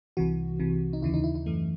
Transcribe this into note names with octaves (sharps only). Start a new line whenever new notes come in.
C2 C3 E3 F#4
C2 C3 E3
D#4
D#2 C#3 E3 E4
D#4
E4
E4
F#2 E3 A3